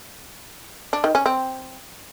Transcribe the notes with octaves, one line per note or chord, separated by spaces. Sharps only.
D4
D#3
C#4
C4